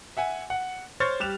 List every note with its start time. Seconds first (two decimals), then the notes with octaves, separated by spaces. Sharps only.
0.17 E5 F#5 G#5
0.50 F#5
1.00 C5 C#5 C#6 F6 A6
1.20 G3 G4 F#6 E7 F7